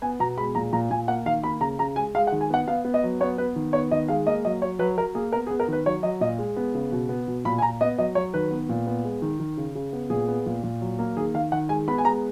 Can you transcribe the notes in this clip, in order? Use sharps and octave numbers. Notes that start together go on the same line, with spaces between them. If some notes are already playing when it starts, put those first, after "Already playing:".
B3 G#5
B2 A#5
G#3 B5
A#2 A#5
A#2 A#5
A#2 G#5
A#3 F#5
D#3 F5
A#3 B5
C#3 A#5
C#3 A#5
G#3 G#5
G#3 F5
F#5
D#3
G#5
B3 F#5
B3 F5
B3
D#5
F#3
B3 C#5
B3 B4
D#3
B3 C#5
D#3 D#5
G#3 F5
A#3 D#5
F#3 D#5
F#3 C#5
F#3 B4
F#3 A#4
A#3 G#4
B3 A#4
G#4
B3
A#4
D#3 B4
F#3 C#5
F#3 D#5
A#2 D#5
G#3
B3
C#3
B2
B3
B2
A#2 B5
G#5
A#2 A#5
B3 D#5
F#3 D#5
F#3 C#5
D#3 B4
B3
A#2
B3
G#3
D#3
D#3
C#3
C#3
B3
A#2 G#4
B3
A#2
A#2
F#3
A#3
D#3 G#4
D#3 F5
D#3 F#5
G#3 G#5
B3 B5
G#5
G#3 A#5